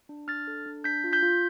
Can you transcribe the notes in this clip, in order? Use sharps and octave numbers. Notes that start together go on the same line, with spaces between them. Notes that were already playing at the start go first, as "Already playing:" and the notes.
D4
D4 F6 A6
A4
D4
D4 G6 B6
F4
G6 B6
F4